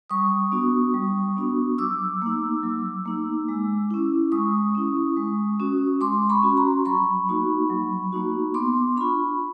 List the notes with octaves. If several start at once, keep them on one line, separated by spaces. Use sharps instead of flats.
G3 C#6 D#6
B3 D4 F#4
G3
B3 D4 F#4
F#3 D6 E6
A#3 D#4
F#3
A#3 D#4
G#3
C#4 E4
G#3 C#6 D#6
C#4 E4
G#3
C#4 F#4
G#3 C6 D6
B5 C#6
C#4 F#4
A#5 C6
F#3 B5 C#6
A#3 D#4 F#4
F#3
A#3 D#4 F#4
B3 C6 D6
D4 F4 B5 C#6